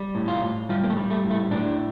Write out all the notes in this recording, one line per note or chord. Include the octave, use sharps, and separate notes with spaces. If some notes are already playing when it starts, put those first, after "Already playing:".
Already playing: G3
A2
F4
A2
G3 F4
A#3
A3
G3
A3
A2
A3
A2 D4